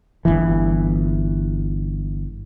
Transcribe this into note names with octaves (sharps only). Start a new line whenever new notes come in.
G1 C#2 E3